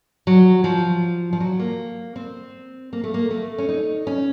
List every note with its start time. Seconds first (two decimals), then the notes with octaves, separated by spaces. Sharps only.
0.27 F#3
0.64 F3
1.33 F3
1.40 F#3
1.59 A#3
2.16 C4
2.93 A#3
3.04 A3
3.14 A#3
3.31 A3
3.58 C#4
3.69 D#4
4.07 C#4